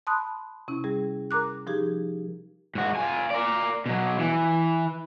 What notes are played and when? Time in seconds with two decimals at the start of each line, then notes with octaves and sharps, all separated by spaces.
0.07 A5 B5 C6 D#6 F#6
0.68 C3 C#4 E4
0.84 G3 G#4
1.31 A#4 A#5 D6 F#6
1.67 F3 D#4 G4 G#4
2.75 G#2 F#4
2.95 F4 G#5
3.30 A#4 D5
3.86 B2 F#3
4.19 E3